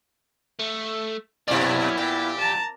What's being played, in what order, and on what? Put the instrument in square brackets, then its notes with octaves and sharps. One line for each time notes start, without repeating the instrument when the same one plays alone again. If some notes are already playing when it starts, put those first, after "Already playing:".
[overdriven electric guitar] A3
[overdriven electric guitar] F#2 C#4 [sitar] B2 D5 [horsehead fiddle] B3 E4
[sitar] A#2 [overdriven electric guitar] G4
[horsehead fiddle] A5 A#5